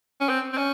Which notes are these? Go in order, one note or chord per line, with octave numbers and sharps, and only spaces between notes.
C#4
C4
C4
C#4